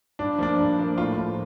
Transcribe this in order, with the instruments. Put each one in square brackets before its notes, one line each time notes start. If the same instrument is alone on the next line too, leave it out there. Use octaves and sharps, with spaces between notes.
[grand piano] G2 D4
F3 A#3 D4
G2
F3 A#3
A2 F4
F3 A#3